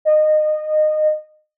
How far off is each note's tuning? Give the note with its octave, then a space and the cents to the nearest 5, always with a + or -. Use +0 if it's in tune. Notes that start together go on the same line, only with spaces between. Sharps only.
D#5 -20